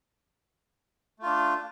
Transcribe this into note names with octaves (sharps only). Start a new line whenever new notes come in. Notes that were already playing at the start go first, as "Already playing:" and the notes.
A3 D4 F4